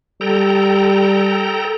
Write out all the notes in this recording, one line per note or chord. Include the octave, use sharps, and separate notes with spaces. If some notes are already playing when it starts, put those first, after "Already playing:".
G3 A4 G5 A#5